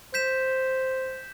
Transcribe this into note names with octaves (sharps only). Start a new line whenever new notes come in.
C5 G6 B6 E7